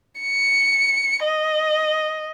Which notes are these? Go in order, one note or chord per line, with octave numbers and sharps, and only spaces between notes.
C#7
D#5